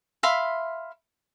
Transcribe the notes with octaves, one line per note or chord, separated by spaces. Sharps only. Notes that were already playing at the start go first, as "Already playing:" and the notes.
E5 F5 B5 C6